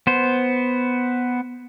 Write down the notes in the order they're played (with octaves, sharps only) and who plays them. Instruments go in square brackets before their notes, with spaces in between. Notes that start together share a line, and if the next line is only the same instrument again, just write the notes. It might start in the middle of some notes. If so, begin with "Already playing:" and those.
[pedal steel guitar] B3 C5